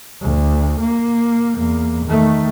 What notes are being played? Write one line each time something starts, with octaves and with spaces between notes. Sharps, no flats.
D2
A#3
E2 A#3
D#3 A3